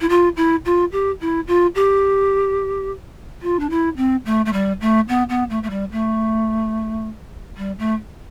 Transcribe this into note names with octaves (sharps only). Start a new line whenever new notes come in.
E4
F4
E4
F4
G4
E4
F4
G4
F4
D4
E4
C4
A3
A3
G3
A3
B3
B3
A3
A3
G3
A3
G3
A3